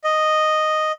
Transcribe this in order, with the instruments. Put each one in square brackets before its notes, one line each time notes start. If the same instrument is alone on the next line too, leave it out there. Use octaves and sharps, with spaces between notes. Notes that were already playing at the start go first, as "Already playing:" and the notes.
[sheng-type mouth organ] D#5